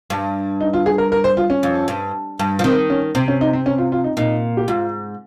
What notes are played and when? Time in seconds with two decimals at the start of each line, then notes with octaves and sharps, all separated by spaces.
0.10 G2
0.60 D#4
0.73 F4
0.86 G#4
0.98 A#4
1.12 A#4
1.24 C5
1.37 F4
1.50 C#4
1.63 F2
1.88 G2
2.39 G2
2.59 F3
2.64 D#3 C4
2.90 C#4
3.15 C3 C4
3.28 C#4
3.41 D#4
3.53 C4
3.66 C#4
3.78 F4
3.92 F4
4.04 D#4
4.17 A#2 D#4
4.57 G4
4.68 G#2 F4